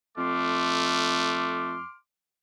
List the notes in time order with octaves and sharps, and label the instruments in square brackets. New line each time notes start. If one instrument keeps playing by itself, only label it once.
[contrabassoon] F2 [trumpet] A3 [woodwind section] C6 D6 F6